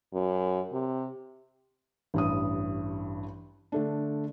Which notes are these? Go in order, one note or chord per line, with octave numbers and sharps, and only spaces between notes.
F#2
C3
A1 G2 D#6
D3 A3 D4